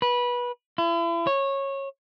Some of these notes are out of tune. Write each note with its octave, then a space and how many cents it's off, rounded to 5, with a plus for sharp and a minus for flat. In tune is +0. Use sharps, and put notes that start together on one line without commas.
B4 -20
E4 +40
C#5 -15